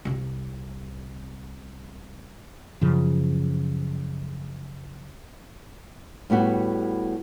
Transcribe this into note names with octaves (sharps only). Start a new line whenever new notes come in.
C2 C3
F#2 C#3 F3
A2 G3 B3 F#4